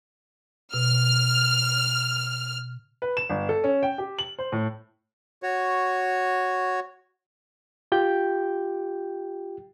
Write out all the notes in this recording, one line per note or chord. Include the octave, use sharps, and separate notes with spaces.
B2 F6
B4
E7
G1
A4
C#4
G5
G4
F#7
C5
A2
F#4 C#5
F4 G4 G5 G6